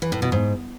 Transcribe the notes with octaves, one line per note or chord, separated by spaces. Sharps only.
E3
A2
B2
G#2